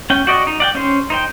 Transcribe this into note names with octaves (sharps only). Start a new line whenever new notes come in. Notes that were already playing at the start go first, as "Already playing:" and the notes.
C#4 G5
F#4 D5 D#5
D#4
D5 F#5 G5
C#4 C5
D#4 C5 G5